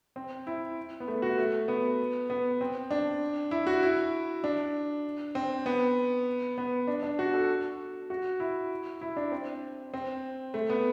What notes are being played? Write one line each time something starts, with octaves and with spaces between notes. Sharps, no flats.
C4
E4
B3
A3
F#4
A3
B3
B3
C4
D4
E4
F#4
E4
D4
C4
B3
B3
D4
D4
F#4
A4
F#4
E4
E4
D4
C4
C4
A3
B3